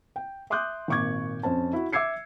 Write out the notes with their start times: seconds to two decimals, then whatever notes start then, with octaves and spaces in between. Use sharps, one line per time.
0.16 G5
0.50 E5 C6 D6 D#6 F#6 G6
0.88 G#1 A#2 C#6 D6 G#6
1.43 F2 C#4 C5 A5
1.73 E4 F#4
1.93 E5 D6 E6 G#6 C7 C#7